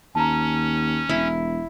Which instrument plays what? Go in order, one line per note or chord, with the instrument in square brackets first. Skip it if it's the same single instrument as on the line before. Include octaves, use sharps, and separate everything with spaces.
[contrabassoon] D#2 [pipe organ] C#4 [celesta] A5 A#5
[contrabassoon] E1 [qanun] E4